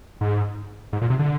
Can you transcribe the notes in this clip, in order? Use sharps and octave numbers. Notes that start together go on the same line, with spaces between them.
G#2
G#2
A#2
C3
D3